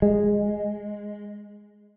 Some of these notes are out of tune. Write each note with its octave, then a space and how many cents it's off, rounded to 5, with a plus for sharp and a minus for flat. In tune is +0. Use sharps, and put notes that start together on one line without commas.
G#3 -5